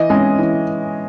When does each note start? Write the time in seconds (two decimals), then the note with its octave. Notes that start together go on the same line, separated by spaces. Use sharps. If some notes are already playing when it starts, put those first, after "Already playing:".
Already playing: E3 D#5
0.10 G#3 C#4
0.39 E3